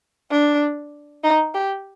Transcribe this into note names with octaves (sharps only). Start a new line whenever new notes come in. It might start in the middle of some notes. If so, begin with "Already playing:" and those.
D4
D#4
G4